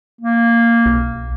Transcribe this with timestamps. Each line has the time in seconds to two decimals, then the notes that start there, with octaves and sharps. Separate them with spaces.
0.21 A#3
0.86 B1